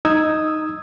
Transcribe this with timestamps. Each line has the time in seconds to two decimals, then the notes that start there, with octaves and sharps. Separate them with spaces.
0.05 D#4 D#6 E6 G#6